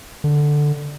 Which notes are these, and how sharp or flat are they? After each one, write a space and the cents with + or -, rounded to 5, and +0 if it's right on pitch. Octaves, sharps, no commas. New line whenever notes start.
D3 +5